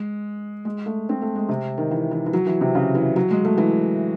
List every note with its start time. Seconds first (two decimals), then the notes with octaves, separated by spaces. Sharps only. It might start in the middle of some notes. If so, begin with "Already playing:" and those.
Already playing: G#3
0.65 G#3
0.86 A3
1.09 C4
1.22 A3
1.35 G#3
1.49 C3
1.78 D#3
1.91 E3
2.11 E3
2.26 E3
2.33 F#3
2.47 E3
2.61 C3
2.75 C#3
2.95 E3
3.16 F#3
3.31 G#3
3.45 A3
3.58 E3